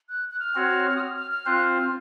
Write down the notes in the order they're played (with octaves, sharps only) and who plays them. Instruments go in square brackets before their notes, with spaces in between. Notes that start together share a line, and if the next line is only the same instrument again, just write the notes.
[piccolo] F#6
F#6
F6
[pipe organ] C4 F#4 C#5
[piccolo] D#6
F6
F6
F6
[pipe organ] C4 F4 C5 [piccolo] F#6
[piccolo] F6